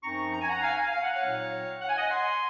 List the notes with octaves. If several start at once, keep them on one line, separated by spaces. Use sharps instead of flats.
F#2 F3 C4 D#4 A#5 C#6
A#5
G#5
F#5 A#5
F5 G#5
F5 G#5
F5
F#5
C#5 F5
A#2 F#3 C4 D#4
F#5
G#5
D#5 F#5
G#5 C6